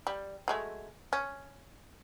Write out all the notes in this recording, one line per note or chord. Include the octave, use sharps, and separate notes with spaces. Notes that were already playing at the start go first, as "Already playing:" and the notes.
G3
F#3 G#3 A3
C#4